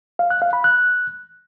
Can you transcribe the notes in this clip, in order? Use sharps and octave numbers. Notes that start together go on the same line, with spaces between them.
F5
F#6
F5
B5
F#6